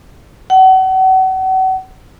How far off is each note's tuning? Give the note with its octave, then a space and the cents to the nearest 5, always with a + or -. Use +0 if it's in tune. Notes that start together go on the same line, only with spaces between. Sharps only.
F#5 +35